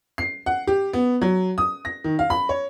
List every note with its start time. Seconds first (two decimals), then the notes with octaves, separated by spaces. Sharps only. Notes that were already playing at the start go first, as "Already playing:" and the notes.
0.18 C7
0.46 F#5
0.67 G4
0.93 B3
1.22 F#3
1.58 D#6
1.85 A#6
2.04 D#3
2.19 F5
2.30 B5
2.49 C#5